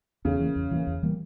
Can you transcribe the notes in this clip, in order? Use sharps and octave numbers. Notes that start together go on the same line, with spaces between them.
E2 C#3
E3 G3 A#3
E2
E3 G3 A#3
E2
E3 G3 A#3